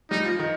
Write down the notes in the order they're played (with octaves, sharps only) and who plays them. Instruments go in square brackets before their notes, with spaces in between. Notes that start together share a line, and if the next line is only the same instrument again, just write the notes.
[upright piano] G3 [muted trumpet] D#4
[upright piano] F3
D#3